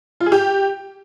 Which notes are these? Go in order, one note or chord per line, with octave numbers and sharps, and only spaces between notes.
F4
G#4
G4